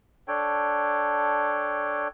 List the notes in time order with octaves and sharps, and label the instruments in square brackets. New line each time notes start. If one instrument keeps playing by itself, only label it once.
[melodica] D4 A4 C#5 G5